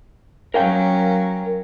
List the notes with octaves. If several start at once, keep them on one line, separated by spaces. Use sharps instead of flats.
F#3 C#4 A#4 F5 G5